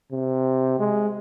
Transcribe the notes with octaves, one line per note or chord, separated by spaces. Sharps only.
C3
G#3